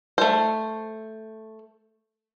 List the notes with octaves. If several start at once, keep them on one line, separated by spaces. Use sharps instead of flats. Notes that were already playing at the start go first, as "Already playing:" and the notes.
A3 C5